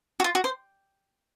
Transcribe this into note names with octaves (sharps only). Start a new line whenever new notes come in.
F#4
F4
F#4
C5